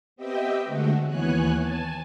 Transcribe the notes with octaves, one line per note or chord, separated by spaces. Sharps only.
B3 C4 G4 D#5 E5 G5
D3 G#3 A3 F#4
D#2 E3 B3 C#5 G#5 F#6
G#5 A5